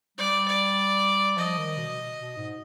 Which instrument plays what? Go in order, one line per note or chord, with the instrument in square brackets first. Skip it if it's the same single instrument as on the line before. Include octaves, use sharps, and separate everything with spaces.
[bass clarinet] G3 [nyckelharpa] D5
[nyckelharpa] D5
[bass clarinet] F3 [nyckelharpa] D#5
[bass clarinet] D#3
B2
B2
G#2